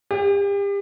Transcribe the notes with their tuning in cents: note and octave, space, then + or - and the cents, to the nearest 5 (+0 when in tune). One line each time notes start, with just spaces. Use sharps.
G4 +35